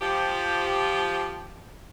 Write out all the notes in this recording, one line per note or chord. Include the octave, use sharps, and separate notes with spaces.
F3 G4